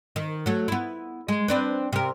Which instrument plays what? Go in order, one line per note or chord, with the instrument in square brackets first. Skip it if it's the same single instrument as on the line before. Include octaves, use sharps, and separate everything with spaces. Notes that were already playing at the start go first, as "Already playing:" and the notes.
[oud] D#3
F#3 A3
B3 E4
G#3
C4 D4 B4
C3 A#4